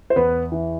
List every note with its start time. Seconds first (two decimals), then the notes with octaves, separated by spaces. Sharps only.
0.10 C5
0.16 E2 B3 B4
0.52 E3